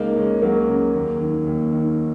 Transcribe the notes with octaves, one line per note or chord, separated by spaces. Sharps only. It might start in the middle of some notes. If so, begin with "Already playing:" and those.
Already playing: C#2 A#3 D#4
C#3 G#3 C#4
C#2 F#3 A#3
C#3
D#2
D#3
D#2
D#3